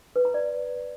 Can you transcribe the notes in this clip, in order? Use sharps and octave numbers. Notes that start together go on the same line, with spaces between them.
B4
A#5
D5